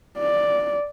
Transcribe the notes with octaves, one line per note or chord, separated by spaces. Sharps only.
D5